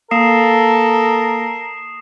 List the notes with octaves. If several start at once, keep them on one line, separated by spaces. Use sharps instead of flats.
A#3 A4 A#4 F5 D#6 C7 E7